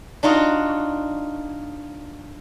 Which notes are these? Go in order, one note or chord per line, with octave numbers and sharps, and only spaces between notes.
D4 D#4 F4 F#4